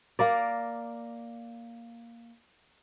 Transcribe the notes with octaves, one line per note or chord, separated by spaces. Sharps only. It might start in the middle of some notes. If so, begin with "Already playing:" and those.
A#3 A#4 D5